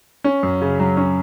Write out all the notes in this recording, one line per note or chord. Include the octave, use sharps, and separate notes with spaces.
C#4
F#2
C#3
F#3
C#4